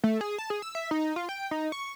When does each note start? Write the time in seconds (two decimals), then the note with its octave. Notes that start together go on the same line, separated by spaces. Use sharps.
0.04 A3
0.21 G#4
0.38 A5
0.50 G#4
0.62 E6
0.75 E5
0.91 D#4
1.16 F4
1.29 G5
1.51 D#4
1.72 C#6